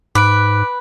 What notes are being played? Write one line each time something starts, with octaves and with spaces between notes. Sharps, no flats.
G#2 B4 D6 F#6 D7